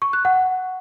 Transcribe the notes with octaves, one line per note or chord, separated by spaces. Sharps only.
C#6
F#6
F#5